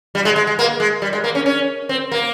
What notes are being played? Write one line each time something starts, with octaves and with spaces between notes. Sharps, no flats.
G3
G#3
G#3
G#3
A#3
G#3
G3
G#3
A#3
C#4
C#4
C4
A#3